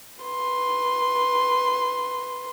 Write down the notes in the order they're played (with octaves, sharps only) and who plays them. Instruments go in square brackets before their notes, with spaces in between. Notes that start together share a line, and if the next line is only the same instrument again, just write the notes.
[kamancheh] B4 C6